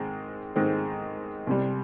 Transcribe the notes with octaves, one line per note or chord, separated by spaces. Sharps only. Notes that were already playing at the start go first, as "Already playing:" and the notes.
Already playing: G#2 D#3 G#3 C4
G#2 D#3 G#3 C4
C2 C3 G3